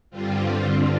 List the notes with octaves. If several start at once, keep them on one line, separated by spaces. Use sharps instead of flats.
G2 D3 G3 C4 F4